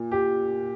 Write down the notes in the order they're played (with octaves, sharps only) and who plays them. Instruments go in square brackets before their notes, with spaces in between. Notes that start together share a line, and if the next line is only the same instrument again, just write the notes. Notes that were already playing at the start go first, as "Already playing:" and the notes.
Already playing: [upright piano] A#2
[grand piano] G4